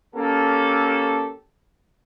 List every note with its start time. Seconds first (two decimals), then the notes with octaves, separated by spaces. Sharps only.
0.16 A#3 C#4 G4 A4